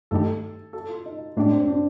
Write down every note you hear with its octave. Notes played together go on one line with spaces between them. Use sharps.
G2 D#3 A3 D#4 G4 A4
A4
F4
D#4
A2 A3 D4 D#4 G4
C4
D4